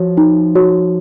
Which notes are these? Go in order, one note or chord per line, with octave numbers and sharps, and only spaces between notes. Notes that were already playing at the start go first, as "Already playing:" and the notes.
Already playing: F3 F#4 C#5
D#4
F#4 C#5